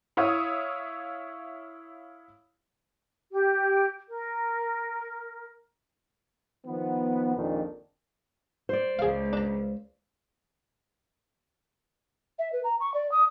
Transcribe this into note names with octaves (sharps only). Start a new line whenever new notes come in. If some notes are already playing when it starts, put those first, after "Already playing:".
E4 C#5 E5 F5 C#6 D#6
G4
A#4
D#3 F3 B3
A#1 F2 A#2 D#3 D4
C5 D5
C#2 G#4 F5
D4 A#5
E5
B4
A#5
C#6
D5
D#6